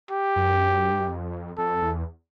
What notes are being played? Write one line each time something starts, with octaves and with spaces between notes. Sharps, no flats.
G4
F#2
G2
F#2
F2
F2 A4
E2